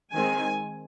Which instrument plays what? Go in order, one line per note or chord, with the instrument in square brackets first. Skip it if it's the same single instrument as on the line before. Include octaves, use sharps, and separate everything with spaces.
[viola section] D#3 G#3 C4 G#5